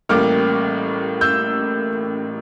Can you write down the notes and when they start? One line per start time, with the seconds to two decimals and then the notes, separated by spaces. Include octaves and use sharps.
0.09 A1 A2 G3 A#3 D6 F6
1.21 E6 G6